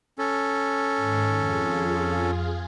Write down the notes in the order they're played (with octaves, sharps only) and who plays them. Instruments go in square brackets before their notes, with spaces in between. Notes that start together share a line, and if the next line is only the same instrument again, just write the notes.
[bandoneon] C#4 A4
[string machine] G#2 D#3
F2 F4 G#4